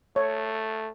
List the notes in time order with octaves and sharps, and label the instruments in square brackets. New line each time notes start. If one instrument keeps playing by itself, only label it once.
[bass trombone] A3 [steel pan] C#5